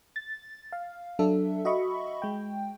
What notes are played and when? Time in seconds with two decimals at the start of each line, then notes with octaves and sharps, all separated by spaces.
0.16 A6
0.72 F5
1.19 F#3 D4 A4 E5
1.65 F#4 D#5 E5 B5 C#6
2.22 G#3 G5